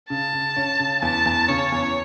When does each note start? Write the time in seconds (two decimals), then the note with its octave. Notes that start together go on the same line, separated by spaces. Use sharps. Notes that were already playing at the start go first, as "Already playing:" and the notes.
0.10 C#3 A5
0.33 C#3
0.56 C#4
0.79 C#3
1.02 E2 A5
1.26 E2
1.48 C#3 C#5
1.72 E2